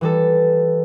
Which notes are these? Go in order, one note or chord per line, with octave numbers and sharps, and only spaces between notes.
E3 G3 A4